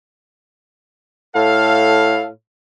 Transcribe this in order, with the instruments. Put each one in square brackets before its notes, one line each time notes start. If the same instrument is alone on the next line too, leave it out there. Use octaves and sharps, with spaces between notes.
[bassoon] A2 [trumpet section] A4 F5